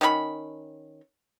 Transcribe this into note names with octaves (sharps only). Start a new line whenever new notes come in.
D#3 C#4 G#4 B5